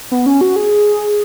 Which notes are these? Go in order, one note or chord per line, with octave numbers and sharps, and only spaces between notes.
B3
C#4
F#4
G#4